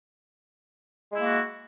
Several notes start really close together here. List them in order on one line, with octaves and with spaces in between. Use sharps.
G#3 E4 A#3 F#4